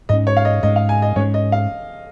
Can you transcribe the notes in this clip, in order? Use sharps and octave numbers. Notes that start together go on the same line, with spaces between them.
G#2 G#3 C#4 D#5
C#5
F5
D#5
G#2 G#3 C#4 D#5
F5
G#5
D#5
G#2 G#3 C#4 C#5
D#5
F5